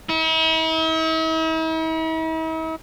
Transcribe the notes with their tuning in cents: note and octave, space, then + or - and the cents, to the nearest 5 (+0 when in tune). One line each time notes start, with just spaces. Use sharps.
E4 -45